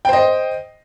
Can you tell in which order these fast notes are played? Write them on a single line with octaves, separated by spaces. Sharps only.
G5 C5 D#5